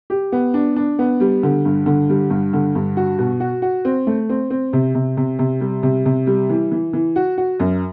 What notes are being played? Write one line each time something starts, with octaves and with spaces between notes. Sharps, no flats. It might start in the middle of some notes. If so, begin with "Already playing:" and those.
G4
B3
D4
D4
B3
G3
D3
G2
D3
G3
G2
D3
G2
F#4
B2
F#4
F#4
C4
A3
C4
C4
C3
C3
C3
C3
G3
C3
C3
G3
E3
E3
E3
F#4
F#4
F#2